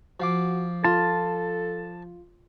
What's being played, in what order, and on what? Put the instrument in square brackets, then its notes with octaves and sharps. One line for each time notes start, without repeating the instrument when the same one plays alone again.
[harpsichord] F3 F5 D6 [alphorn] F#4
[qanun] F4 [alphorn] A4 [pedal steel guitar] A5